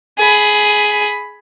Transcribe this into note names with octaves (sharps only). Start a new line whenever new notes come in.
G#4 B5